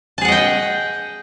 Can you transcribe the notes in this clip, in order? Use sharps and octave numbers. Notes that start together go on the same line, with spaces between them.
G#4 D#5 F#5 G5 A5